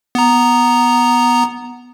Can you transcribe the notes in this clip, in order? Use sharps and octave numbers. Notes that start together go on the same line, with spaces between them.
B3 A#5